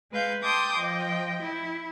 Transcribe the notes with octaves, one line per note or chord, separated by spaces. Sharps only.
G#3 B4 F5 G6
G5 A5 C6 D6 D#6 G6
F3 D#5 G5
E4